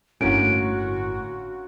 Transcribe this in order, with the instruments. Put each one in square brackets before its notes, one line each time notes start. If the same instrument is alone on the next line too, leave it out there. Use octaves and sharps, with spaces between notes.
[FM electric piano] G1 A2 [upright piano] D3 A#3 C#4 [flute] F#4 [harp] D7